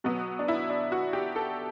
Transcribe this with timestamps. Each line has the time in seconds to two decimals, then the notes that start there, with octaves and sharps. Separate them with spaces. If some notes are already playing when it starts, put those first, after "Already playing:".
0.04 B2 F#3 B3
0.39 D4
0.48 E4
0.70 D4
0.92 F#4
1.13 G4
1.36 A4